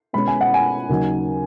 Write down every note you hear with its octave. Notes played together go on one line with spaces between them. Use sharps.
B2 G#3 C#4 B5
G#5
F#5
G#5
D#2 C#3 F#3 D#4